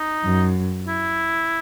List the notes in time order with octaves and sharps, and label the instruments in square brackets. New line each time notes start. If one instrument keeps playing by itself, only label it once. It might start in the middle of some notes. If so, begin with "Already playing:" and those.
Already playing: [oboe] D#4
[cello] F#2
[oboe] E4